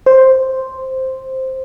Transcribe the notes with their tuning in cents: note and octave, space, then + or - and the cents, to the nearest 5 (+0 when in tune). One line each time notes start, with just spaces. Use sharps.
C5 +0